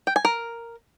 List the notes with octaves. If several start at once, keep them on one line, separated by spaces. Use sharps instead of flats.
G5
G#5
A#4